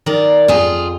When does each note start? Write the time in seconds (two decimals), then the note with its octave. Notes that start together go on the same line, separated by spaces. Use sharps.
0.06 D#3 A#4 D5
0.48 F2 F4 G#4